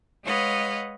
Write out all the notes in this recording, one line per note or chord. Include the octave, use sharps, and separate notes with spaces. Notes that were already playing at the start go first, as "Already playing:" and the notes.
G#3 B4 C#5 D#5 F5 F#5